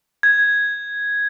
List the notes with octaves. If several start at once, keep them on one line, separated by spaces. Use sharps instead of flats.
G#6